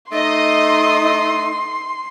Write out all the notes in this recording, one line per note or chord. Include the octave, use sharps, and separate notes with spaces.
A3 D#4 D#5 C6